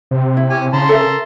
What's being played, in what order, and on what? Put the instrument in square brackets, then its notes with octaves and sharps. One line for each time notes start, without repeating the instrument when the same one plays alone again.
[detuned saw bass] C3
[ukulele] E4
[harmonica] C#4 G4 G#5
[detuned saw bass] C#3 [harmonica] A5 A#5 C6
[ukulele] A4 A#4 E5